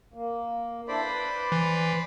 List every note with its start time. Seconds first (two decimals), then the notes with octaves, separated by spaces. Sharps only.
0.14 A#3
0.88 D4 E4 A4 C5 D5 B5
1.03 B4
1.52 E3